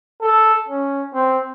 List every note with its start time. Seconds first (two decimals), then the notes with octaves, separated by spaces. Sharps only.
0.22 A4
0.69 C#4
1.15 C4